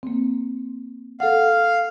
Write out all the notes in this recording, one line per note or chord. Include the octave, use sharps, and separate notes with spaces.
A#3 C4
A4 F5 F#5